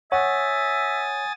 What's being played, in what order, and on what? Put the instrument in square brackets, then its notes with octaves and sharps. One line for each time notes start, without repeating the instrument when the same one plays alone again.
[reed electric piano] C#5 [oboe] E5 [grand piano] F#5 [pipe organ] G#5 D#6 A6